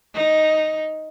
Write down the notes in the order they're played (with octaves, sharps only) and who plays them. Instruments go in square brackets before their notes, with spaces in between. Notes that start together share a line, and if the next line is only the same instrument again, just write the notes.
[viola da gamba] D#4